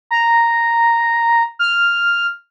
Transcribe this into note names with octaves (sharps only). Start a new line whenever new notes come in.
A#5
F6